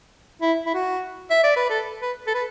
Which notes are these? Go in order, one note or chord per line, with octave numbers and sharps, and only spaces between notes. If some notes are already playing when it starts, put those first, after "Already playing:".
E4
E4
F#4
E5
D5
B4
A4
B4
A4
B4